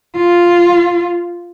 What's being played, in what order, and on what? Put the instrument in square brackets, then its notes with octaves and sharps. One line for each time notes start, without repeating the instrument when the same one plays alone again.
[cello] F4